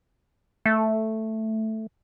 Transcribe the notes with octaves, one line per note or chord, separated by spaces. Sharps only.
A3